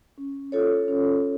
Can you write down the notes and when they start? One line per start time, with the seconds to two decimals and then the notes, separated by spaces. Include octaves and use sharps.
0.18 C#4
0.52 F4 A4 C#5
0.88 C#4